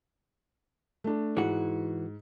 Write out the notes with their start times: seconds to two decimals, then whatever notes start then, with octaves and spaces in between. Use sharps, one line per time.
1.04 A3 D4
1.37 G#2 E3 F#4